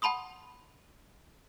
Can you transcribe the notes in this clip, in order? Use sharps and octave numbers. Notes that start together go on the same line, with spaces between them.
F#5 A5 B5 C6 D#6